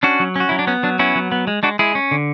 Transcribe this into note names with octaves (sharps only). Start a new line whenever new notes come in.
C#4 D4 F#4
F#3
C#4 F#4
F#3 E4
D4
B3 C#4
F#3 D4
B3 C#4 E4
F#3
B3
G#3
G#3 D4 F#4
G#3 E4 G#4
C#4
D3